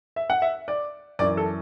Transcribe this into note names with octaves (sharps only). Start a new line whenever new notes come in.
E5
F#5
E5
D5
F#2 E3 D5
A4